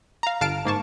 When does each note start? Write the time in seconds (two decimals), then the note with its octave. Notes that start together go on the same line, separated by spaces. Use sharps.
0.23 F5 A#5
0.41 G1 F5 A5 F6 D7
0.65 G#2 A#3 A5 C#6